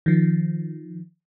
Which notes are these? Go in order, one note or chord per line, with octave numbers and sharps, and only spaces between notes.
D#3 F3